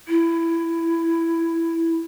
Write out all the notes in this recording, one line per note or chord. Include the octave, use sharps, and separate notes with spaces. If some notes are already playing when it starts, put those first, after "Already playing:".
E4